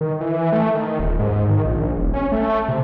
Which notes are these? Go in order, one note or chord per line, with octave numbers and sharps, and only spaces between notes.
D#3
E3
A3
D#3
D#1
G#2
D#3
A#1
E1
C#4
A3
C3